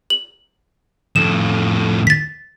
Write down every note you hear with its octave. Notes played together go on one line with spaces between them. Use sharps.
F#7
F2 A2 E7
A6 B6